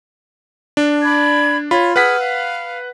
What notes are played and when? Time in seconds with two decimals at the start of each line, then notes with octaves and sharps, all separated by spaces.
0.77 D4
1.03 D5 B5 G#6
1.71 F4 C#5 B5
1.96 G#4 B4 F#5 E6 F6 B6
2.18 F5